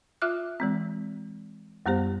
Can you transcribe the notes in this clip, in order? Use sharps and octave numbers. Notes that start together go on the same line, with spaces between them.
F4 E5 D6 F6 F#6
E3 G#3 C4
F#2 G3 B3 G4 C5